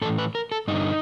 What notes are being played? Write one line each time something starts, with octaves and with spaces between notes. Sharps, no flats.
A2 E3 A4
B4
A#4
A4
G2 D3 D#4